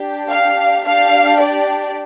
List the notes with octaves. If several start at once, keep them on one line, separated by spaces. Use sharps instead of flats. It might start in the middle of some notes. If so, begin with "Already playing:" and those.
Already playing: D4 G4
F5
D4 G4 F5
D5